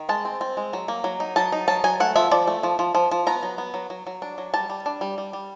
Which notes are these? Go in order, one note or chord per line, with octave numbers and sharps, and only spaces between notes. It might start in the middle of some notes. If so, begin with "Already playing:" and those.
Already playing: D#3
G#3 A5
C4
C4
G#3
F#3
A#3
F#3
D#4
F#3 A5
D#4
F#3 A5
F#3 G#5
A3 F#5
F3 E5
F3 D5
A3
F3
F3
F3
F3
B3 A#5
F#3
B3
F#3
F#3
F#3
D4
F#3
G3 A5
G3
D4
G3
G3
G3